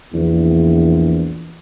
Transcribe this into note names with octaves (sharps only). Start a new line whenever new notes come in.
A#1 E2